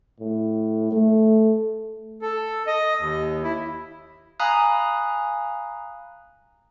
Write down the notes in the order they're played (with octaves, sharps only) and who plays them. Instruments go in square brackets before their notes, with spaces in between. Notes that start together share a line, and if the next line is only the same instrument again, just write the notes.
[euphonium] A2
A3
[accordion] A4
D#5
D#2
E4
[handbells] F5 G#5 A#5 B5 D#6 F#6